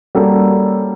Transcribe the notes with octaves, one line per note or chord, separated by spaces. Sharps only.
G3 A#3 C#4 F#4 A4